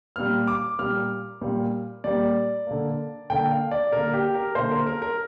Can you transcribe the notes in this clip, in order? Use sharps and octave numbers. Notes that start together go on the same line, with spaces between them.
A#2 G3 A#3 F6
D6
A#2 G3 A#3 F6
A#2 G3 A#3
A#2 G3 A#3 D5
D3 A#3
D3 A#3 G5
F5
D5
D3 A#3 A#4
G4
A#4
D3 A#3 C5
A#4
A#4
A#4